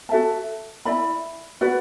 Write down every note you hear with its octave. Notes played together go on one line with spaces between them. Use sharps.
F#4 A4 E5 A5
E4 D5 B5
F#4 B4 D5 F#5